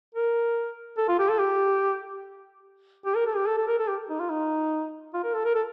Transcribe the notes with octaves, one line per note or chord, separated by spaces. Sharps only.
A#4
A4
F4
G4
A4
G4
G4
A#4
A4
G4
A4
A4
A#4
A4
G4
D#4
F4
D#4
F4
A#4
A4
A#4
A4